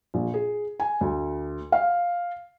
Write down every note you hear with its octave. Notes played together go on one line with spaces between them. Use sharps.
A#1
G#4
G#5
D2
F5